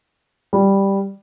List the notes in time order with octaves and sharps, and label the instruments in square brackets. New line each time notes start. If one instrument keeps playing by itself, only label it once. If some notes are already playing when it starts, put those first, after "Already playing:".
[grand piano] G3